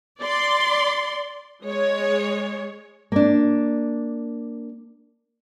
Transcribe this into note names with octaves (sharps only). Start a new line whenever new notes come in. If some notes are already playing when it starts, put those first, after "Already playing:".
D5 C6
G#3 C#5
A#3 D4